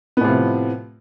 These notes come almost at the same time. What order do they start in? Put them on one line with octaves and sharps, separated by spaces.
B3 A2 C3 F3